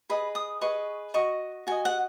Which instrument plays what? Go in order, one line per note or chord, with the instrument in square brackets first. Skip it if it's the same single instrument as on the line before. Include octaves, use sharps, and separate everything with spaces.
[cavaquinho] G#4 B4 D#5 B5
D#6
G#4 B4 D#5 C#6
F#4 D#5 C#6
F#4 D#5 G#5
F#5